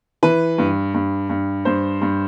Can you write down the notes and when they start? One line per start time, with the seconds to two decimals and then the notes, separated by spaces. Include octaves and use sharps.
0.23 E3 B4
0.58 G2
0.94 G2
1.29 G2
1.65 G2 C5
2.02 G2